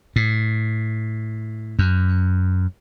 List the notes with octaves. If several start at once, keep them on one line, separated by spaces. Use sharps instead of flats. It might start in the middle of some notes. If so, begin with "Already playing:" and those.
A2
F#2